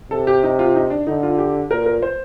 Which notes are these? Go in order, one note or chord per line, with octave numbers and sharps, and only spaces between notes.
C3 A4
G4
D#4
F4
D#4
D4
D3 D#4
F4
G4
A#2 A#4
A#4
C5